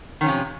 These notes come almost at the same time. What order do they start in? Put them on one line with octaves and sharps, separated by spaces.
D#3 C#4 F3 C3